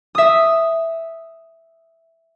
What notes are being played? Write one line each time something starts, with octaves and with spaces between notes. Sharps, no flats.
E5 D#6